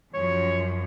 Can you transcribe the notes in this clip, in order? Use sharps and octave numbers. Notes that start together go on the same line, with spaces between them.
F#2 F3 C#5